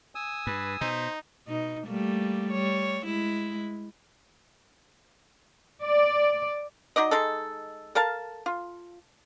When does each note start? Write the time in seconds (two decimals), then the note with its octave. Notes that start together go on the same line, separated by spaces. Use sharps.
0.15 G#5 D#6 E6
0.47 G2 B4
0.81 B2 D#4 C5
1.47 B2 D#4
1.87 G3 A3 A#3
2.51 G3 C#5
3.04 G#3 E4
5.83 D5
6.96 F#3 D#4 D5 D#5
7.11 G#3 D#4 A4
7.95 A4 A#4 F5 A5
8.46 F4